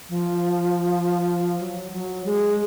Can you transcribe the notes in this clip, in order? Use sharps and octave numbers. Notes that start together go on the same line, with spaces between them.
F3
F#3
F#3
G#3